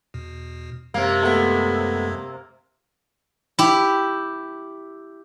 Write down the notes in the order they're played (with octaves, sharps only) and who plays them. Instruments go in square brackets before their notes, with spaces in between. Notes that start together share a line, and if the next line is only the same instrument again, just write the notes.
[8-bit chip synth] E2 B2
[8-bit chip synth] F#2 G#3 G#6 [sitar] C3 A#3 [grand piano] F5
[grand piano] A3 B3
[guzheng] E4 G4